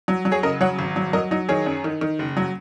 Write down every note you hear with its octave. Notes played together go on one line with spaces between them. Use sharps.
F#3
F#3
G#4 C#5
C#3 A#4 D#5
F#3 C#5 F#5
G#1
F#3
F#3 A#4 D#5
F#3 D#4
D#3 G#4 C#5
F#2
D#3
D#3
F#1
F#3